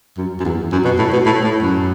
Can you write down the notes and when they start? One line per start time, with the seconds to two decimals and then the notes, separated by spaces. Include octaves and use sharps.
0.17 F#2
0.40 F#2
0.44 E2
0.72 F#2
0.85 B2
0.98 A2
1.13 B2
1.25 A2
1.43 A2
1.62 F#2